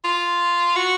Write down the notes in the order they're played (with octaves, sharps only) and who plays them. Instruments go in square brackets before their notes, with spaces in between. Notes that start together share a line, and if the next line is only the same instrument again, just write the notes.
[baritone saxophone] F4
F#4